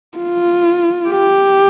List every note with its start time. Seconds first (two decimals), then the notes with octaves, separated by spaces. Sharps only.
0.18 F4
1.09 G4